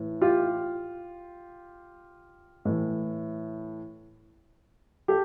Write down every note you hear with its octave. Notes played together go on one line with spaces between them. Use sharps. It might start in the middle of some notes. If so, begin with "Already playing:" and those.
Already playing: A2 E3
F4 G4
A2 E3
G4 A4